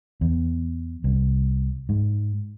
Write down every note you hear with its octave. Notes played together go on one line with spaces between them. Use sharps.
E2
C2
G#2